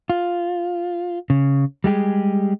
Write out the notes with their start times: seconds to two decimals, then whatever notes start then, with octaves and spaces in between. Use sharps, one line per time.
0.10 F4
1.30 C#3
1.84 G3 G#3 G4 G#4